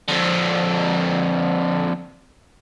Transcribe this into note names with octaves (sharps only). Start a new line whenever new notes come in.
F2 D3